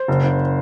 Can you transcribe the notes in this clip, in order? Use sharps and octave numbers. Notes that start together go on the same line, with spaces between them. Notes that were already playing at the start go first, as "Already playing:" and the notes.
Already playing: C5
F#1
F#1